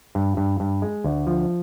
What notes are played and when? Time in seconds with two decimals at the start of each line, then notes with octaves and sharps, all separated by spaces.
0.15 G2
0.37 G2
0.60 G2
0.82 G#3
1.04 D2
1.27 F3